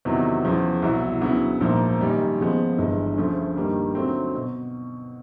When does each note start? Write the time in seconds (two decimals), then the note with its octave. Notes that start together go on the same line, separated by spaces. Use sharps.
0.05 E2 C3 D#3 F#3 B3
0.45 E2 C#3 F3
0.82 C2 B2 F#3 B3 E4
1.21 D2 C#3 F#3 B3 E4
1.61 A#1 G#2 F3 A#3
2.00 F#2 D#3 G3 A#3 D#4
2.39 D#2 C#3 F3 G#3 B3
2.78 G1 G2 E3 G#3
3.17 D2 C#3 F3 A3
3.56 G2 D#3 G3 A#3
3.95 D#2 D3 F#3 A3 C4
4.35 B2